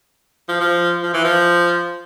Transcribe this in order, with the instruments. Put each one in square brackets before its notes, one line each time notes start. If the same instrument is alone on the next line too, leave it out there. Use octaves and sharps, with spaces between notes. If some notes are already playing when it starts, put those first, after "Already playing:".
[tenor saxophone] F3
F3
F3
E3
F3